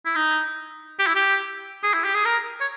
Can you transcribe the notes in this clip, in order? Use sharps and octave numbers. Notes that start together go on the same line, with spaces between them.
E4
D#4
G4
E4
G4
G#4
E4
G4
G#4
A#4
C#5